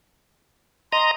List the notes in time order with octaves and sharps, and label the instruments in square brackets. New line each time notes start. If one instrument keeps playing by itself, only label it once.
[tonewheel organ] D#5 A#5 [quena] C6